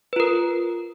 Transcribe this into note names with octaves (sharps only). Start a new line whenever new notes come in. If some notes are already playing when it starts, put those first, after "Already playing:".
F4 A#4 B4